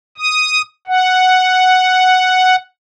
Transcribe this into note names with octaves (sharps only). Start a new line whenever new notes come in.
D#6
F#5